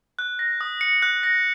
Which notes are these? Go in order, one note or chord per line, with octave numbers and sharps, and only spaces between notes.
F#6
A#6
D#6
C#7
F#6
A#6